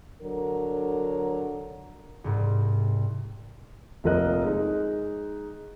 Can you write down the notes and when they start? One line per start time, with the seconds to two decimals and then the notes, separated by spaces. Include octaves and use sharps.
0.22 D3 F#3 A#4
2.24 C2 G#2
4.04 F1 A#1 F3 A#4 D#5 F#6
4.44 G#3 D#4